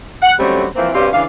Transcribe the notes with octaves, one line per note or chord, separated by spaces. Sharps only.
F#5
D3 F#3 G3 A3 C4 C#4
E3 F3 A#3 C4
G2 B2 C4 C#4 G4 F5
C#3 E3 D4 F5